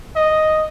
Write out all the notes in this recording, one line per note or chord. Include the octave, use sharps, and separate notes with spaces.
D#5